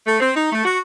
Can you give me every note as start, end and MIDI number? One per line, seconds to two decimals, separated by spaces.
0.07 0.18 57
0.20 0.30 60
0.34 0.47 63
0.52 0.62 57
0.64 0.78 66